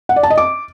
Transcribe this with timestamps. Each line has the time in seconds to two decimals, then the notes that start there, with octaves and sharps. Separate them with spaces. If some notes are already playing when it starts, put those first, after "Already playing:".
0.09 F#5
0.16 D5
0.23 A5
0.30 D#5
0.38 D6